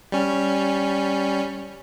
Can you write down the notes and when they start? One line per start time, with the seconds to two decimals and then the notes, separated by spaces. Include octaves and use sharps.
0.12 G3 C#4